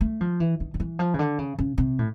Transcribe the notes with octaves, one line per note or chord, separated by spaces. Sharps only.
A3
F3
E3
D#3
D#3
E3
F3
C#3
D3
C#3
C#3
C3
A2